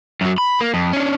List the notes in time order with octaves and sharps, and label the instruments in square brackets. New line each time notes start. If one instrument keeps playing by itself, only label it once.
[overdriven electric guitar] F#2 F#3
B5
A#3
F2
C#4 D4